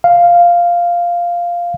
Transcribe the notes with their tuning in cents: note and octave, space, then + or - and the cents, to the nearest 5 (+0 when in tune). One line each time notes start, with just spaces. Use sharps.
F5 -5